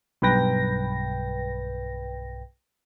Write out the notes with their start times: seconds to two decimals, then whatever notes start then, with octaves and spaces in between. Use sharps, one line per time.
0.22 B1 G2 B4 G5 A#6